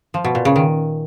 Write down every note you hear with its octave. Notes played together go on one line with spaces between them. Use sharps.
F3
B2
A#2
C#3
D#3